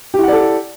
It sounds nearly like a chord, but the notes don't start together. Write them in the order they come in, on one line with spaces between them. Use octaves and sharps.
G4 E4 F#5 D5 A4